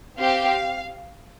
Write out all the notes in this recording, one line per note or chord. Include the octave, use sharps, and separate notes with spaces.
C4 G4 F5